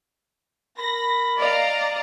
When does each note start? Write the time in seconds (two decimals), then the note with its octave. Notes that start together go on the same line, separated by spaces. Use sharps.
0.78 A#4 B5 A#6
1.39 D5 D#5 F5 A#5